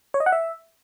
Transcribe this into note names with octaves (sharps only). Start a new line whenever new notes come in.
C#5
D#5
F#5
E5